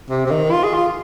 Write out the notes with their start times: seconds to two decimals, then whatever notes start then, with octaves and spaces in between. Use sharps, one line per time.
0.10 C3
0.26 C3
0.31 D#3
0.52 F4
0.64 G#4
0.74 F4